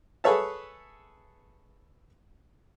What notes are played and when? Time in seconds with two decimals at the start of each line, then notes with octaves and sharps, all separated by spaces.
0.24 G#4 A4 B4 C#5 E5 A5